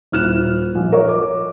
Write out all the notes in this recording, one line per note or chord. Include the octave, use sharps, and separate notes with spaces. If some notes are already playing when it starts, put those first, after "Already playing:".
D#1 E4 F6 F#6 E7
A#1
A#4 C#5 D#5
D6